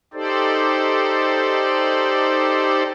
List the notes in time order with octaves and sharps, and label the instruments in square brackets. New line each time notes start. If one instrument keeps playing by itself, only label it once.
[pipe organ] D#4 G4 A4 C5 D5